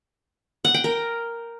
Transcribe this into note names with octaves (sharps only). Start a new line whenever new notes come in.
F#5
G5
A#4